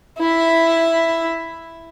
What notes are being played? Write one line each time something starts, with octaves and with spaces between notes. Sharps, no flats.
E4 E5